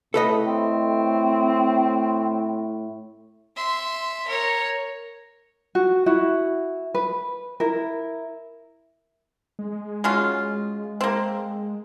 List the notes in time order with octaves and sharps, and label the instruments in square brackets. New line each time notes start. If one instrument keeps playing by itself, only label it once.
[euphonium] A2 [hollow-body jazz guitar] A4 B4 D#5
[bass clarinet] C4
[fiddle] E5 C6
A#4 C#5
[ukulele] F#4
E4 F#4
B4
E4 A#4
[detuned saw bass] G#3
[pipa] F#3 C#4 F4
A#3 C4